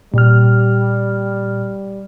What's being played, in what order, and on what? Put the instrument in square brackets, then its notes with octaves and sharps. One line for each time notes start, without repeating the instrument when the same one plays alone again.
[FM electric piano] A#2 F6 [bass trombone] G3